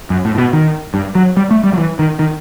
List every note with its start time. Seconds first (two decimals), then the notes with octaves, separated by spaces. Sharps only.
0.10 F#2
0.25 A2
0.35 A2
0.38 B2
0.53 D#3
0.94 G2
1.15 F#3
1.37 G3
1.51 A3
1.63 G3
1.73 F#3
1.78 E3
1.99 D#3
2.19 D#3